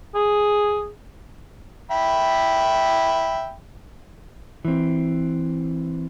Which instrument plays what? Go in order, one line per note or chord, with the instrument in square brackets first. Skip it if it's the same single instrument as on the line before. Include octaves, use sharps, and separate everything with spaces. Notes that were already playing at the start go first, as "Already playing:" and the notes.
[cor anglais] G#4
[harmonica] E5 G5 B5
[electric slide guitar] E3 C4